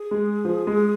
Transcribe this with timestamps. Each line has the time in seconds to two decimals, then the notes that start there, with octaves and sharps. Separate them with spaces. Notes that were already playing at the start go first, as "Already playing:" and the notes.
Already playing: G#4
0.11 G#3
0.45 F3
0.67 G#3